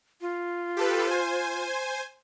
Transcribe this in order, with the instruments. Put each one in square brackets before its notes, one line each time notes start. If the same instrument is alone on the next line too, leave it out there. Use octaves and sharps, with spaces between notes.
[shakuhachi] F4
[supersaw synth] G4 A4 B4
C5 G#5